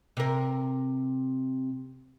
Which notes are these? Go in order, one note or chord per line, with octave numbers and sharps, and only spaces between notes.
C3 A#4